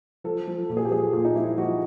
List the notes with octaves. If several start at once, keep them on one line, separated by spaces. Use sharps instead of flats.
F3 A4
F3
A#2 A4
G#4
G4
F3 G#4
A#2 F4
D#4
F3 E4
F3 F#4